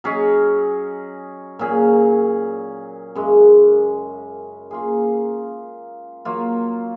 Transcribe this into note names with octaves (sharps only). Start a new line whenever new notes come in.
F#3 C#4 G#4 D#5
A#2 F#3 C#4 G#4
F#2 C#3 G#3
A#3 F4 G#4
F#3 A#3 F4